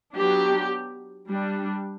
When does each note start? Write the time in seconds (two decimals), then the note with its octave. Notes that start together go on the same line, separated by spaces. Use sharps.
0.15 F#3 B3 D4 G4
1.29 G3 D4